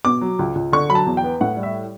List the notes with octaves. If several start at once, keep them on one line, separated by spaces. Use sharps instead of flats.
B2 D6
F#3
C#2
C#2
D3 C#6
F#3 B5
A5
E2
G5
B3
A2 F#5
G3
E5